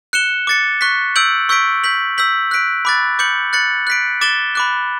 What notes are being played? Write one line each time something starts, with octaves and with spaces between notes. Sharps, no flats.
F#6 C#7 E7 G7
D6 A6 C#7
C#6 F#6 B6
E6 G6 D7 F#7
C#6 E6 G6 B6 D7
G6 B6 F#7
E6 G6 B6 F#7
F#6 B6 D7
B5 D6 F#6 A6
D6 G6 C#7 F#7
F#6 A6 C#7 F#7
F#6 B6 D7
D6 A6 E7 G7
B5 D6 F#6